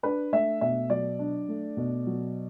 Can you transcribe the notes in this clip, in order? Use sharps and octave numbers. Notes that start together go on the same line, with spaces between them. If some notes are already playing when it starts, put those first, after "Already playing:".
D4 B4
A3 E5
B2 E5
F#3 D5
D4
A3
B2
F#3